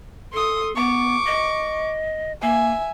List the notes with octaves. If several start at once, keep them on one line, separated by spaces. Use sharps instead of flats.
A4 C6 D#6
B3 C#6 D6
D#5
A#3 E5 G#5